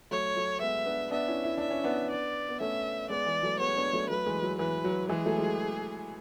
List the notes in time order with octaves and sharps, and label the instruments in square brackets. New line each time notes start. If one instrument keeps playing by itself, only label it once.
[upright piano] F#3 A3 [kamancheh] C#5
[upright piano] F#3 A3
[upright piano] G#3 B3 [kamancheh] E5
[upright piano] B3 D4
[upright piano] B3 D4 [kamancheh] E5
[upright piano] C#4 E4
E4
[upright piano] D4 [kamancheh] E5
[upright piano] C#4
B3 D4
[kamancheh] D5
[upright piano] B3
[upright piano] A3 C#4 [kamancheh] E5
[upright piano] G#3 B3 [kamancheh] D5
[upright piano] E3 G#3
F#3 A3
[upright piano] G#3 B3 [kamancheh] C#5
[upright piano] B3 D4
F#3 A3
[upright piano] F#3 A3 [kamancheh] B4
[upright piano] E3 G#3
F#3
[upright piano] E3 [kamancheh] B4
[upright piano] F#3
[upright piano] E3 G#3 [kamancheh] G#4
[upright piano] F#3 A3
G#3
F#3